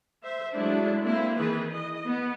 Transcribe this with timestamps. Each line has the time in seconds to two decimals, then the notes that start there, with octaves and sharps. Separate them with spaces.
0.24 C5 E5
0.55 F#3 G#3 A3 D4 E4
1.04 A#3 C4 E4
1.37 D#3 E3 G#4 B4
1.72 D#5
2.06 B3